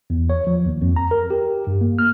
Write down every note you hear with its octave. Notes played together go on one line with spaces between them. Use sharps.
E2
C#5
F3
D#2
F2
A#5
A#4
G4
G2
A#3
F6